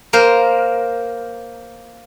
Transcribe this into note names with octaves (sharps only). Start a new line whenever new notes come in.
A#3 A#4 C5